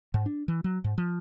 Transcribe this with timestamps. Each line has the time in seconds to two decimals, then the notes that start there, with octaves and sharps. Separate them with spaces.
0.14 G#2
0.26 D4
0.48 E3
0.64 F#3
0.84 G#2
0.98 F3